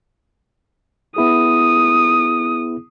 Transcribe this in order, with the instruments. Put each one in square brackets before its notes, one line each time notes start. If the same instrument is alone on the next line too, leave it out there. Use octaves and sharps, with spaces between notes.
[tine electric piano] B3 E4 G#4 [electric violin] D#6